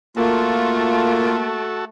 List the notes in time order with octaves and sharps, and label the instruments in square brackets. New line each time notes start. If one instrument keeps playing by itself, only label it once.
[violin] A3 [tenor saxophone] A#3 [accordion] F4 [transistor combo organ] F#4 A4